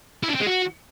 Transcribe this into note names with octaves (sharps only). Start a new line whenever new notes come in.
E4
D4
C4
G#3
F#4